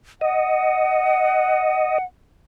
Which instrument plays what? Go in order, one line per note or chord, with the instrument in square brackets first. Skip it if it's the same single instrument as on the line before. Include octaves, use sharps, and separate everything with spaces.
[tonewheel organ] D#5 [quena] F#5